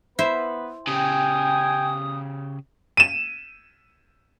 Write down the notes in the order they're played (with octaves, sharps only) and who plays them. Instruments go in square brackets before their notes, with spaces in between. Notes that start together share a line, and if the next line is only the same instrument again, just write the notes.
[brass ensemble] B3 B4 [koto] E4 C5 E5
[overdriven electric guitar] C#3 G4 [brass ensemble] G5 G#5 [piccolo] D#6
[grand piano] D#7 E7